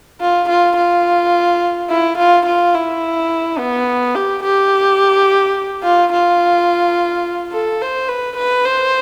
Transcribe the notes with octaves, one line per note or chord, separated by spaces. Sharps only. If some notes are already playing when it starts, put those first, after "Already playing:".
F4
F4
F4
E4
F4
F4
E4
B3
G4
G4
F4
F4
A4
C5
B4
B4
C5